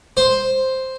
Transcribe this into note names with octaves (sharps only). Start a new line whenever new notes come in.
C5